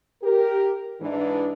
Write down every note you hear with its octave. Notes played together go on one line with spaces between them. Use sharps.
G4 A#4
G#2 E3 D4